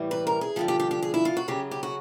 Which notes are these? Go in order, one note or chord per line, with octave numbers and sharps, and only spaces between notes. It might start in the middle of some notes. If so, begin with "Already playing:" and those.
Already playing: A2 E3 G3
B4
A#4
G#4
G2 D3 F3 G4
G4
G4
G4
G#4
E4
F4
F#4
F#2 C#3 F#3 G4
G4
F#4